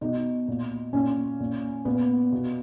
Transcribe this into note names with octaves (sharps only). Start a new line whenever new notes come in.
B2 D#4
A#2
A#2 C#4
A#2
A#2 B3
B2